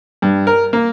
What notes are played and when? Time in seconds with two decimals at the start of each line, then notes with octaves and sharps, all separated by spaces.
0.22 G2
0.47 A#4
0.73 A#3